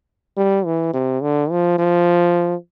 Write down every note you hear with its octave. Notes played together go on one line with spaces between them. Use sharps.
G3
E3
C3
D3
F3
F3